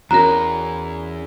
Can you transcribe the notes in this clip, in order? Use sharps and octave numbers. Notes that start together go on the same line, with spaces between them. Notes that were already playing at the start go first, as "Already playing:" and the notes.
E2 E3 C#4 F#4 A#4 A#5